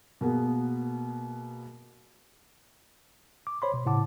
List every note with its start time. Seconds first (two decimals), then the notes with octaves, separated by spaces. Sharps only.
0.21 B2 A#3 B3 G#4
3.47 D6
3.62 C5 C#5 B5 C6
3.74 B2
3.85 A2 C#3 E4 F#5 A5 D6